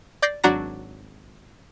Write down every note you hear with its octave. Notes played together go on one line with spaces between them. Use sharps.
D5 G6 A#6 C7
G#1 F#3 D4 F#4 A#5 A#6